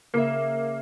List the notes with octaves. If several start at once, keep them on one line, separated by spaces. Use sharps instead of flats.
C#3 A#3 E5